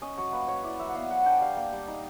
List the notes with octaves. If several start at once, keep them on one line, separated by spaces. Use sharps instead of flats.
C#4 D#5
F#3 C#5
A#3 B4
F#3 C#5
E4 D5
F#3 E5
F#5
B3 F5
F#3 F#5
D4 G5
G3 F5
A#3
G3
D#4